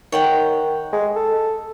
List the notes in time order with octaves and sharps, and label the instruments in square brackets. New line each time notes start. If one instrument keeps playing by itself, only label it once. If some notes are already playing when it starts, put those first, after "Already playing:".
[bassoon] D#3 [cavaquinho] C#5 F#5 G5
[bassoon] G#3
A4